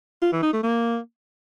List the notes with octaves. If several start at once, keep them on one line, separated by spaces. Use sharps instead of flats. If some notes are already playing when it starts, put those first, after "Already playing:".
F4
E3
D#4
A3
A#3